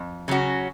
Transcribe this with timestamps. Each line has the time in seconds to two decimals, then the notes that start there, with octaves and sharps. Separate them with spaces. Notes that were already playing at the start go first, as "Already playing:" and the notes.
Already playing: F2
0.28 C#3 F#3 C#4 F#4